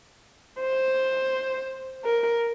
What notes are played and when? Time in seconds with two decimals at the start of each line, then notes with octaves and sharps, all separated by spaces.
0.60 C5
2.05 A#4